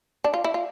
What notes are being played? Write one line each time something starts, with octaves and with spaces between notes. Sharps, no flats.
D4
F4
E4
F4